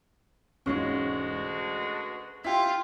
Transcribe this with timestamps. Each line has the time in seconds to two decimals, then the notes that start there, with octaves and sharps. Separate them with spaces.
0.66 E1 D2 G#2 G#3 C#4 F4 F#4 C#5
1.81 B4
2.44 E4 F4 G4 B6